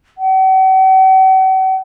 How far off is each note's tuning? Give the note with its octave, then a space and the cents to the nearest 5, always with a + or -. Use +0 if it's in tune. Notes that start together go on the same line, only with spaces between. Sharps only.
F#5 +45